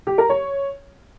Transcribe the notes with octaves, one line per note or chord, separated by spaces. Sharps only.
G4
A#4
C#5